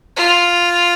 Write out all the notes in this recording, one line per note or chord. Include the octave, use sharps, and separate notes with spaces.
F4